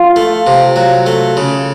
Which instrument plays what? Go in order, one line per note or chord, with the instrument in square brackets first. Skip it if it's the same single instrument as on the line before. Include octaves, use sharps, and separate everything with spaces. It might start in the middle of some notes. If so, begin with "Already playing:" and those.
Already playing: [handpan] F4
[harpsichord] A3
C3
F#3
A3
C#3